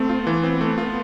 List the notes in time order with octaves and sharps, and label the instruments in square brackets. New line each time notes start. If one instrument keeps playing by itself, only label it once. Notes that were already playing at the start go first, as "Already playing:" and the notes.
Already playing: [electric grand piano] A3 [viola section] C4
[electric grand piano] F4
[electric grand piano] E3 [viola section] B3
[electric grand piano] C4
A3
F4